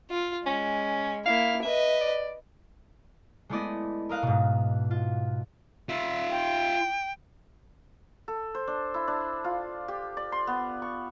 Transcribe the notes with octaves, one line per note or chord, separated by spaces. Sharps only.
F4
G#3 C#4
A#3 E4 F5
B4 D#5 E5
D5
G#3 A3 B3 E4 D5 D#5
A#4 D#5 F5 F6 F#6
G#2 B2
F4
F4 E5
G5
A4
C5
D4
E4
D4
F4
G4
D5
C6
B3
C#6